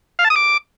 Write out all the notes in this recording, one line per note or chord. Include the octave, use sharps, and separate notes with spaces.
F5
A5
D#6
D6